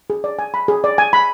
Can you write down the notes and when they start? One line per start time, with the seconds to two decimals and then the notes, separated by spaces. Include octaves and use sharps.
0.10 G#4
0.24 D5
0.39 G#5
0.54 B5
0.68 G#4
0.84 D5
0.98 G#5
1.13 B5